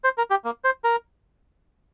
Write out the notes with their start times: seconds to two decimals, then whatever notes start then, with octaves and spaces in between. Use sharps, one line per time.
0.04 C5
0.18 A#4
0.30 G4
0.45 A#3
0.64 C5
0.84 A#4